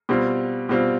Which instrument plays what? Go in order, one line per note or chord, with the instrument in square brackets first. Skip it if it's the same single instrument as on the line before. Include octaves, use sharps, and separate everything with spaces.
[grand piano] B2 G3 C4 F4
B2 G3 C4 F4